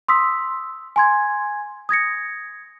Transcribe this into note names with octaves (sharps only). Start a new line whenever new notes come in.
C6 D#6 E6 B6
G#5 C6 G#6
D#6 G#6 A#6 C#7